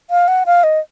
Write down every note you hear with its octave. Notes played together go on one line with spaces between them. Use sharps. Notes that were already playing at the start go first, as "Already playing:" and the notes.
F5
F#5
F5
D#5